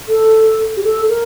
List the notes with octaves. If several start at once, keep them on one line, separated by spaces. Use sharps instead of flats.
A4
G4
A4
A#4